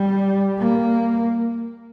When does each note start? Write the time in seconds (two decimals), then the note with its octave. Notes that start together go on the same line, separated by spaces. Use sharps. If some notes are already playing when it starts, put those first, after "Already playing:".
Already playing: G3
0.59 A#3